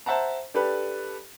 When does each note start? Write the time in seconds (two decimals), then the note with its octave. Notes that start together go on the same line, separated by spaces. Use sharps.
0.06 C5 E5 F#5 A5 A#5
0.54 D4 G4 A4 B4